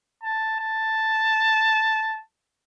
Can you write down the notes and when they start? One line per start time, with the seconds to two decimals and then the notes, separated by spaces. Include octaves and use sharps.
0.24 A5
0.60 A5